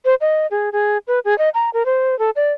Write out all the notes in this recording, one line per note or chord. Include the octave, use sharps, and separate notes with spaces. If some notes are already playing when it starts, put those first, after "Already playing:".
C5
D#5
G#4
G#4
B4
G#4
D#5
A#5
A#4
C5
A4
D5